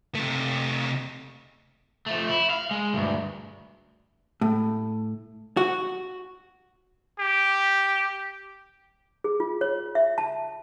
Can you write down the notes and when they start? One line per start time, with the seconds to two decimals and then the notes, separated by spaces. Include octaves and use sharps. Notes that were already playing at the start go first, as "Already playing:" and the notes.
0.15 C3 A3
2.06 F3 A3
2.29 E4
2.50 F5
2.71 G#3
2.94 D2 G2
4.41 A2
5.57 F#4
7.19 G4
9.24 G#4
9.40 F4
9.61 C#5
9.95 E5
10.18 A5